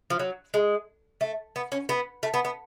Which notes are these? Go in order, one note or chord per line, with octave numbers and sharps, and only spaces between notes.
F3
F#3
G#3
A3
B3
C#4
B3
A3
B3
B3